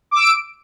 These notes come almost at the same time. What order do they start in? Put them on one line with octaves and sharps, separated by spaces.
D6 E6 D7